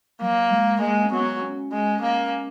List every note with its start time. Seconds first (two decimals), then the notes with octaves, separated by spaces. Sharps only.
0.21 F#3 A#3
0.51 G#3
0.81 G#3 A#3
1.05 C#4
1.12 F#3 B3
1.42 C#4
1.72 G#3
2.02 A#3